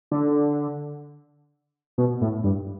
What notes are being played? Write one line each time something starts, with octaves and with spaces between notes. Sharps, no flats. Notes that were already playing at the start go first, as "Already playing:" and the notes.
D3
B2
A2
G2